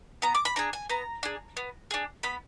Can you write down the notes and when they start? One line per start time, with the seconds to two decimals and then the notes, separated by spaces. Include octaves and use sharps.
0.22 B3 A#5
0.35 D6
0.45 B5
0.56 D4 G#4 A#5
0.73 G#5
0.90 B3 A#5
1.23 D4 G#4
1.57 B3
1.91 D4 G#4
2.23 B3 B5